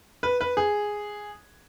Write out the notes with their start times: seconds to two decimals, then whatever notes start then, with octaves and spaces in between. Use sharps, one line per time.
0.23 B4
0.41 B4
0.57 G#4